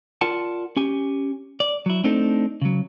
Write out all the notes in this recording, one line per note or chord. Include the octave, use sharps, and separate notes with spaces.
F4 A#4 D5 F#5 A5
C#4 G4 G#5
D5
F#3 E4
A3 C4 D4 D#4 A4
C#3 F#3